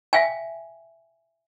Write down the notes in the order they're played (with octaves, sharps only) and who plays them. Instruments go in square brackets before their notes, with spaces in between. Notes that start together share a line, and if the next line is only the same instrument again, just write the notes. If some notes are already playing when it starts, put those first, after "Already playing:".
[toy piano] E5 F5 G5 G#5